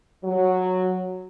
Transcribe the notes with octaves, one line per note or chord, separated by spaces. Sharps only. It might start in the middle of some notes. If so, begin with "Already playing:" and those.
F#3